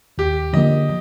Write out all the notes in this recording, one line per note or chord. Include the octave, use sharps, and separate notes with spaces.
D#2 G4
D3 F3 A#3 D#5